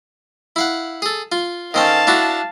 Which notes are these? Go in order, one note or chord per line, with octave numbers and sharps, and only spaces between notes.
E4 F5 F#5
G#4 A4
F4
D#3 C4 C#4 F5 A5
D4 E4 F#4